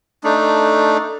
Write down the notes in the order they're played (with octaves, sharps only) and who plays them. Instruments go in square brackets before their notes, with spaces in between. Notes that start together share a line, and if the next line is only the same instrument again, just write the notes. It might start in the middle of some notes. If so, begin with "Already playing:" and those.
[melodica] A3 D4 D#4